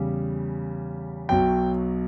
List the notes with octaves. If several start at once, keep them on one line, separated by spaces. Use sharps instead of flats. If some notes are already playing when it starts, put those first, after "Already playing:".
Already playing: E2 C#3 G3
B1 B2 F#3 G5